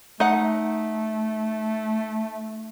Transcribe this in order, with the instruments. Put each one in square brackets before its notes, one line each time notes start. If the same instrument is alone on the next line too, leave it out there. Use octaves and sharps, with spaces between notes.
[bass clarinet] A3 [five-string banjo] D#4 F#5